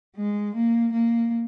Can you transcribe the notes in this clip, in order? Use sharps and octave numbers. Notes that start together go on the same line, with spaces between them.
G#3
A#3
A#3